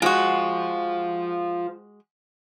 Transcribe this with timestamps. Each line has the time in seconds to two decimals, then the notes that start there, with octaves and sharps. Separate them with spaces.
0.02 G#3 F4 F#4 C5